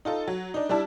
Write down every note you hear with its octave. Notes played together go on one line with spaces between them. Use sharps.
D#4 F4 A4
F#3
D4 D#4
G3 D4 E4 A5